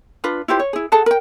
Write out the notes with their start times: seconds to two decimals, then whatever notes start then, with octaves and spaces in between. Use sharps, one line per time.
0.24 D4 F4 B4
0.48 E4 F4 G4 C5
0.59 C#5
0.73 E4 G#4
0.92 G#4 A4 F#5 A5
1.06 A#4 G5